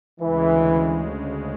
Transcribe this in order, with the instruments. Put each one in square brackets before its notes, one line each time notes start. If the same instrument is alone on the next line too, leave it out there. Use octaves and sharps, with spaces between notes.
[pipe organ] D2 C#3 G#3 [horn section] E3